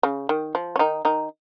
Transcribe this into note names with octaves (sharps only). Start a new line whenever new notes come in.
C#3
D#3
F3
C#4
D#3 D#4
D#3 D#4